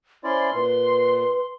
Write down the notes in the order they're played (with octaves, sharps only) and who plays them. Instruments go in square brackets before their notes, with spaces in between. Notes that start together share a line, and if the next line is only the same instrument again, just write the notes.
[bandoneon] C#4 E4 D5 [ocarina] C5 [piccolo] C6
[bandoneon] A#2 [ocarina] B4